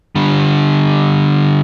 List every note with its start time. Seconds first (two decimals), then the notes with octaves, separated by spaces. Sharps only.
0.15 D3 G3